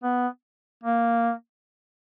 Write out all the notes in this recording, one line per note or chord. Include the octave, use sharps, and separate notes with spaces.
B3
A#3